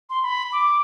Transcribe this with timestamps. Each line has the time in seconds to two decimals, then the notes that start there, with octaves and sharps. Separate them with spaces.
0.10 C6
0.23 B5
0.53 D6